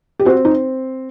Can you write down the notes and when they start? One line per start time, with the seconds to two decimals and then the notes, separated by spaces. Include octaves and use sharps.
0.19 G4
0.25 C4 F#4
0.45 D#4